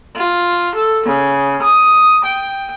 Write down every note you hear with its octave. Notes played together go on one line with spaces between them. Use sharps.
F4
A4
C#3
D#6
G5